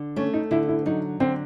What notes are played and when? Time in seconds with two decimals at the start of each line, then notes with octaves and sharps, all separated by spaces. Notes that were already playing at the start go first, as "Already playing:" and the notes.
Already playing: D3
0.16 A3 C#4
0.34 D#4
0.51 D3 E4
0.68 E4
0.86 F#3 D#4
1.20 D3 C4